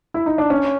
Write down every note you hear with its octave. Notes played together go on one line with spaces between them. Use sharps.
E4
D#4
D4
C#4